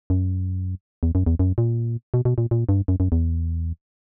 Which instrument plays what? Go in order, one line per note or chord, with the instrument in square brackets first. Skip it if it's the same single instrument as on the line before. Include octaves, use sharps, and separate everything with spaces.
[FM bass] F#2
E2
F#2
E2
F#2
A#2
B2
B2
A#2
A#2
G2
F#2
F#2
E2